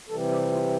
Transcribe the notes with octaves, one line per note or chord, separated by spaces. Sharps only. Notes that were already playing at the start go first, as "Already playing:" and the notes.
C3 E3 G3 A4
G4
F4